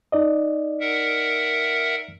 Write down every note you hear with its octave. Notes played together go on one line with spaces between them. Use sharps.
D#4 D5 D#5
A#4 E5 F#5